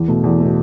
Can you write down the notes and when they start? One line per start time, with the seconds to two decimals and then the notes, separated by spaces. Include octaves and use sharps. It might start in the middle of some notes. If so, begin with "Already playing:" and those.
Already playing: E2
0.08 B2 A3
0.24 E2
0.40 B2 A3